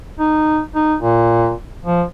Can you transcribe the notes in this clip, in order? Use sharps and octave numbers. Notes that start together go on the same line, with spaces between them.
D#4
D#4
A#2
F3